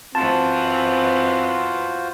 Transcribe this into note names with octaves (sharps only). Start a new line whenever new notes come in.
F#2 E3 B3 C4 F4 F#4 C5 A5